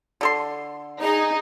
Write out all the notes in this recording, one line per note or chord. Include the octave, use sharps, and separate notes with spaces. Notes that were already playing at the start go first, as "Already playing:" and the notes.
D3 A4 C6
D#4 G#4